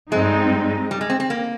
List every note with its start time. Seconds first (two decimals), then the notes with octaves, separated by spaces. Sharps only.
0.11 G2 G3 G#3 C4 D#4
0.91 G3
1.01 G#3
1.10 C4
1.20 C4
1.30 A#3